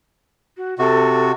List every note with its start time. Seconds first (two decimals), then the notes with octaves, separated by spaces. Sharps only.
0.57 F#4
0.79 C3 F#4 A4